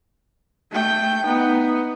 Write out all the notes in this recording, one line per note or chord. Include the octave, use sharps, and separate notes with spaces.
A3 G5
B3 D#4